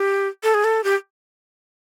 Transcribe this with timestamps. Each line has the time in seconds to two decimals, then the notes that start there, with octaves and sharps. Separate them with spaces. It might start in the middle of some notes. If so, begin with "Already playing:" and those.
Already playing: G4
0.43 A4
0.54 G#4
0.64 A4
0.84 G4